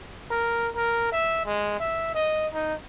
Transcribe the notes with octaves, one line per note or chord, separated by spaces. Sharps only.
A#4
A#4
E5
G#3
E5
D#5
D#4